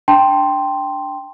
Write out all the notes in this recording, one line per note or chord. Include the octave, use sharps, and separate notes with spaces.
D4 G5 A5 C6